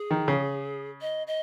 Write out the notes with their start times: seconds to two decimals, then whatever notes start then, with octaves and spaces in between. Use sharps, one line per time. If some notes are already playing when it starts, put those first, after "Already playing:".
Already playing: G#4
0.11 D#3
0.28 C#3
1.01 D#5
1.27 D#5